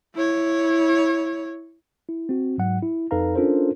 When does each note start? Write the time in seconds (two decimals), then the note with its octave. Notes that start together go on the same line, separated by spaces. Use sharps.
0.15 E4 C#5
2.09 E4
2.29 C4 F#4
2.58 G#2 F#3 F#5
2.83 E4
3.11 F2 D#4 A4 B4 F5 A#5
3.35 C#4 D4 F4 A4 A#4 C5